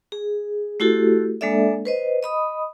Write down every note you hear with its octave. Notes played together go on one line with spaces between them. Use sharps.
G#4
A3 E4 F#4 G4 A4
G#3 A#3 D4 A4 D5 E5
B4 C5 D#5
D#5 B5 D#6